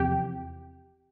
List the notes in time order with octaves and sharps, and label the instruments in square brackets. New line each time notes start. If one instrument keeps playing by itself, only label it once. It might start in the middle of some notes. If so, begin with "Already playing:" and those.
Already playing: [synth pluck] E2 C3 F3 G4